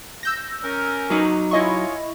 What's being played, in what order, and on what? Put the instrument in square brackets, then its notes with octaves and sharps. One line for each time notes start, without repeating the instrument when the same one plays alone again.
[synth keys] E6 G6 A#6
[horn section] C#4 A#4
[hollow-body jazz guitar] F#3 D#4
[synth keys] E4 D#5 C#6 [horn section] F4 C#5 G#5